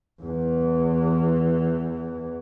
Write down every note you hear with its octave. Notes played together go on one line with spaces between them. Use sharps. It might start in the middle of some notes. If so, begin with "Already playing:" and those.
E2 E3